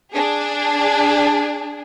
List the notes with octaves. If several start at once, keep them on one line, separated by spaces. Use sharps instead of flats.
D4 G#4